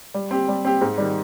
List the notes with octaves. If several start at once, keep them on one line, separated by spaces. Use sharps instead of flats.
G3
C4 G4
G3
C4 G4
G#2
D#3 G3